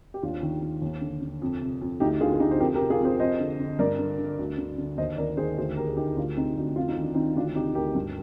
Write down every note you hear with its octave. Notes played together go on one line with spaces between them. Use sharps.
G4
D#2 D4 F4
D#3
D#3
D#2
D3
D3
F2
C3
F2
D2 D#4 G4
D3 F4 G#4
G#4
D3 D#4 G4
C5
F2 G4 A#4
G4 A#4
C3
F4 G#4
F2 G#4 C5
F2 C5 D#5
D3
D3
G2 A#4 D5
D3
D3
D2
D3
D3
D#2 C5 D#5
D#3 A#4 D5
D#3 G#4 C5
D2 G#4 C5
D3 G4 A#4
G#4
D3 D#4 G4
D2 D4 F4
C3 C4 D#4
D2 D4
F2 F4
D#4
D#3
D4
D#3 C4 D#4
D2 D4 F4
C3 D#4 G4
D2 G4 A#4
G2